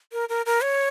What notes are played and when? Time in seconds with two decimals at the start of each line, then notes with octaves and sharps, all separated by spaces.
0.13 A#4
0.29 A#4
0.46 A#4
0.63 C#5